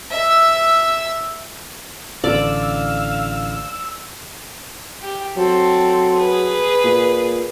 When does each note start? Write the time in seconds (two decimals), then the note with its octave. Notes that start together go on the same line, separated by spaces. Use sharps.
0.11 E5 E6
2.24 A1 D3 D5 F5 E6
5.02 G4
5.37 F#3 C4 A4
6.16 G#4 B4
6.84 A#2